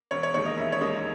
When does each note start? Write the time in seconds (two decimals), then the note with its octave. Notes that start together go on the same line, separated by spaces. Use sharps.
0.11 E1 C#5
0.23 C#5
0.34 D#2 D#3 G#3 C#5
0.46 D#5
0.57 E1 E5
0.72 C#5
0.81 D#2 D#3 G#3 D#5